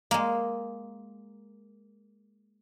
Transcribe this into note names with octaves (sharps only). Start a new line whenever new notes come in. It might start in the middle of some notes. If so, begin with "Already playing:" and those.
G#3 A#3